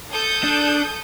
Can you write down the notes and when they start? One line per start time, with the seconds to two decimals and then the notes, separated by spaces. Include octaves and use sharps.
0.12 A4 D#6 G6
0.43 D4